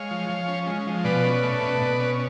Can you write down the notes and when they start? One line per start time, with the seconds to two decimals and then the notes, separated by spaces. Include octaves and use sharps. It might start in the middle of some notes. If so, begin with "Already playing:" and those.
Already playing: G#3 C#5 F5
0.11 F3
0.29 F3
0.48 C#4
0.67 G#3
0.87 F3
1.04 B2 B4 D5
1.25 C#4
1.43 A3
1.62 B2
1.81 B2
1.99 C#4